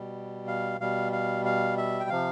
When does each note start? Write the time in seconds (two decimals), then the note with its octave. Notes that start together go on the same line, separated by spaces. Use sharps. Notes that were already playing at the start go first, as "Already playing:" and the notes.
Already playing: B2 G3
0.48 F5
0.80 B2 G3 F5
1.12 F5
1.45 F5
1.78 E5
2.00 G5
2.09 C3 F3 F5